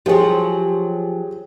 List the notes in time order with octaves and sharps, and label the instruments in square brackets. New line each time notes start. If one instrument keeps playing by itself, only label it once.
[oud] F3 F#3 [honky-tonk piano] G4 G#4 G5